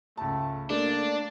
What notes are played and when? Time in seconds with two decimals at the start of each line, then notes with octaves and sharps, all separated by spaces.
0.17 C#2 A3 A5
0.70 A3 A#3 D4 D5